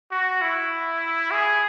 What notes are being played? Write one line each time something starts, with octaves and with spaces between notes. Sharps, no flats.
F#4
E4
G#4